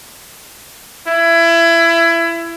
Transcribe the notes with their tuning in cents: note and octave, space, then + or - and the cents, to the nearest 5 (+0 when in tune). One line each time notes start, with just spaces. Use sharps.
E4 +25